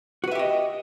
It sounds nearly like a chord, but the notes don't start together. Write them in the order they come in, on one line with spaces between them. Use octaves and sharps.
F#4 B4 E5 G4 D#5